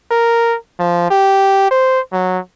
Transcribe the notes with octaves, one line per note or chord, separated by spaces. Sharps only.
A#4
F3
G4
C5
F#3